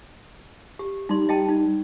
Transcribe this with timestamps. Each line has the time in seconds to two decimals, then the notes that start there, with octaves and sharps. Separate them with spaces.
0.79 G4
1.09 G3 D#4 C6
1.29 G3 D#5 G5 A5
1.49 D#4